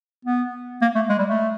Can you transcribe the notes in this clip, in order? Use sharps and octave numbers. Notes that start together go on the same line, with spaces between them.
B3
A#3
A3
G#3
G3
A3